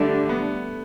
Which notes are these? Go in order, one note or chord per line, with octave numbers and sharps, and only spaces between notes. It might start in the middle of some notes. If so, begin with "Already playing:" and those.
Already playing: D3 G3 A3 D4
B3